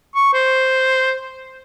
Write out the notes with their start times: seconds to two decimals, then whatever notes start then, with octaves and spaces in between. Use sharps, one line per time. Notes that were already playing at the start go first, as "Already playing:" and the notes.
0.15 C#6
0.33 C5